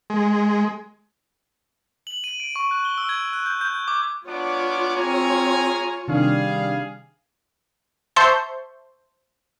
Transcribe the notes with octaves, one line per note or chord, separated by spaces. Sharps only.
G#3
F#7
D#7
D7
C#6
F#6
G7
E6
G#6
F#6
G6
G6
D6
B3 D4 F4 C#5 D6
C4 G#4 G#5 A#5
C3 D#3 G3 D4 G#4 F5
C5 E5 A5 C6 C#6 G6